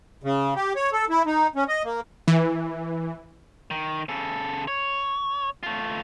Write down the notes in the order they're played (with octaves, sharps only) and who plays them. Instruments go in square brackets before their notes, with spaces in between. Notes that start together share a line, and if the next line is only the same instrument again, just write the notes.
[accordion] C#3
G4
C#5
A4
E4
D#4
C#4
D#5
A#3
[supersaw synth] E3
[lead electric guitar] D#3
C#3 A4
C#5
A3 F4